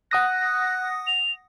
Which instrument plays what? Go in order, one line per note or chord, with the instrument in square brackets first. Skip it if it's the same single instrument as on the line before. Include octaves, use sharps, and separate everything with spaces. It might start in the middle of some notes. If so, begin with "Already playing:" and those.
[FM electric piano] F#5 D#6 A#6 [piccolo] F#6
[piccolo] F7